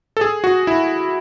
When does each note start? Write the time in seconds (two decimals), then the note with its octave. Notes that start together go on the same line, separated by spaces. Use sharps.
0.17 A4
0.21 G#4
0.44 F#4
0.67 E4